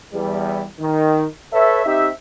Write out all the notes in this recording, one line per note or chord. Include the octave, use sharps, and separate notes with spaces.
E2 G3
D#3
A4 B4 C#5 E5
C4 D#4 G4 E5